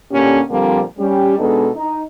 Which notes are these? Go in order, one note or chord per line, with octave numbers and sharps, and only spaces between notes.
A#2 D3 A#3 C#4 G4
A#2 D3 F3 G3 A#3 C4
G3 C#4 G4
B2 G#3 B3 D4 D#4 A4
D#4